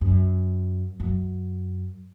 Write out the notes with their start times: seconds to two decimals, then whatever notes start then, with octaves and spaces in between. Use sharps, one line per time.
0.01 F#2
1.00 F#2